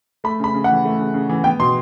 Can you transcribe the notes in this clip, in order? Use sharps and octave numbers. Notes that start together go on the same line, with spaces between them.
A3 B5
C#3 B5
C#3
E3 F#5
A3
C#3
C#3
E3
B3 G5
B2 C6